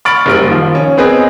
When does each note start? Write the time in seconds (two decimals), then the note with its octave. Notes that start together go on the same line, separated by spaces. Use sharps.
0.05 B5 C#6 F6 A6 D7 F#7
0.26 F#1 G3 D7
0.48 D#3 F3
0.75 C#4
0.97 B3 C4 G#4 B4 D#5